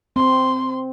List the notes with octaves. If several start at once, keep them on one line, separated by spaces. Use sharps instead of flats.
C4 C6